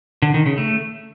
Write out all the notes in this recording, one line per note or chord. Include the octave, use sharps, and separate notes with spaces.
D3
D#3
C#3
A3